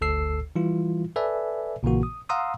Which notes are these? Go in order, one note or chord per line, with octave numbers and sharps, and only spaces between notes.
G1 D2 A4 E6 C7
E3 G3 E4 F4
A4 B4 D5 E5 G#5
A#1 A#2 C#3 E3 A#3 F#4
D#6
F5 F#5 A#5 C6 D#6 E6